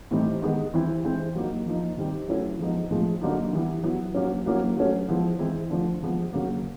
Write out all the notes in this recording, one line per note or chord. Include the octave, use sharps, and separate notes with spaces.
A2 E3 G3 C4 D#4
D#3 G#3 B3
E3 G3 C4 E4
E3 G#3 C4
F#3 A#3 D#4
F3 A#3 D#4
C3 D#3 G3 C4 D#4
F#3 A3 C#4 E4
F3 G#3 B3 D#4
A2 F3 G#3 C4
D3 F#3 A#3 D#4
E3 G3 B3 E4
F#3 B3 E4
F#3 A#3 C#4
F#3 A#3 C#4 E4
F#3 A3 C#4
F3 G#3 B3 E4
E3 G#3 C4 E4
D3 F3 A3 D4
C3 F3 G#3 B3
C#3 F#3 A#3